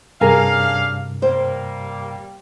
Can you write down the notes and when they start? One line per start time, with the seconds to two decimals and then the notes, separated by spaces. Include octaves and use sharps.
0.21 G2 C3 C#4 D4 G#4 A#4 F5
1.22 G3 A#3 C5